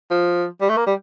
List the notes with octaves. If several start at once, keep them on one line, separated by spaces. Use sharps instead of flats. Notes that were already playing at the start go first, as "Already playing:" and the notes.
F3
G3
A3
A#3
G3